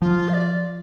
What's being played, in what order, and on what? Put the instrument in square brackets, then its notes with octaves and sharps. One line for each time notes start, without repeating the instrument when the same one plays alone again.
[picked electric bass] F3 [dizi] F4
[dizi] F5
D5